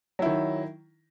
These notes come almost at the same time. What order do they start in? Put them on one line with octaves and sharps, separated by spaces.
F#3 E4 D#3